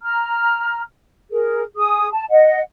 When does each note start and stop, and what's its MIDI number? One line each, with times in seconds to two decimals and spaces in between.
0.02 0.81 82
0.02 0.81 89
1.30 1.62 68
1.30 1.62 70
1.76 2.07 68
1.76 2.07 87
2.12 2.25 81
2.30 2.59 75
2.30 2.59 78